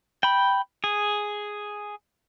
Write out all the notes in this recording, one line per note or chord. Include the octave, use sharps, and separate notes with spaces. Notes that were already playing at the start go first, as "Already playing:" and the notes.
G5 B5
G#4